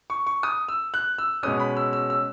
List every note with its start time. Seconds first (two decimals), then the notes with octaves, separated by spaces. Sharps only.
0.10 C#6
0.27 C#6
0.43 D#6
0.68 E6
0.94 F#6
1.18 E6
1.43 B2 G#3 C#4 D#6
1.59 B5
1.77 E6
1.93 E6
2.10 E6